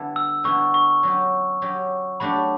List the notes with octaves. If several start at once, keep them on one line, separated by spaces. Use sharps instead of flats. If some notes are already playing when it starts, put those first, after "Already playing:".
Already playing: D3 G3 B3 E4
E6
D3 G3 B3 E4 C#6
C#6
F#3 C#4 G4
F#3 C#4 G4
F#3 A3 D4 G4 B5